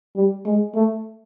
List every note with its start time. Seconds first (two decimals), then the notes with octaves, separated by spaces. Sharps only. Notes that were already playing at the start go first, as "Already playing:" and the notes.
0.16 G3
0.46 G#3
0.75 A3